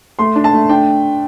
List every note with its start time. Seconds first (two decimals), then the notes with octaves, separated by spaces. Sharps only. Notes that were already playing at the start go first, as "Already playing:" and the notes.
0.19 A3 C6
0.36 D4
0.44 A5
0.53 A3
0.69 D4 G5